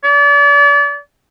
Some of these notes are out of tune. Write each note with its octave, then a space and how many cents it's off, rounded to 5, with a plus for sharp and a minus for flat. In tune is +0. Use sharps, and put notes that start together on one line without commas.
D5 -35